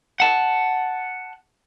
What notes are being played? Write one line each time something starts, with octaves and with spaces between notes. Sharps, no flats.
F#5 A5